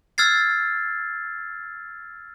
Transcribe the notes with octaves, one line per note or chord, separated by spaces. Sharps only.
E6 F6 G#6 A6 C7